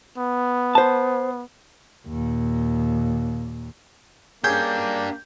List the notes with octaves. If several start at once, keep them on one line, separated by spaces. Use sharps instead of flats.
B3
C5 A5
D#2 A#2
A#3 C#4 D4 G4 G#4 G6